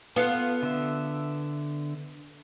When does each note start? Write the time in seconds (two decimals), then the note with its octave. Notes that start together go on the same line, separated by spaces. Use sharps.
0.16 B3 F4 A4 F5
0.63 D3 E5